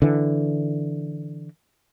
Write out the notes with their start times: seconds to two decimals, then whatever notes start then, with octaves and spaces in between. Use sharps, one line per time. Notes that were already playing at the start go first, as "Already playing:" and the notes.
0.02 D3 E3